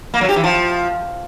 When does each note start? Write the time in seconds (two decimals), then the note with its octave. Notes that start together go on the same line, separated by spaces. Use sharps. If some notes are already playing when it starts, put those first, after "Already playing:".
0.14 A#3
0.21 F#3
0.29 G4
0.36 E3
0.44 F3